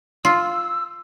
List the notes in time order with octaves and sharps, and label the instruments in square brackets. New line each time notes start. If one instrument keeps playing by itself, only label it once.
[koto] F4 [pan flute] E6